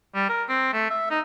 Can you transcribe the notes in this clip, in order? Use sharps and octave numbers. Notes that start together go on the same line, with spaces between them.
G3
A#4
C4
A3
E5
D#4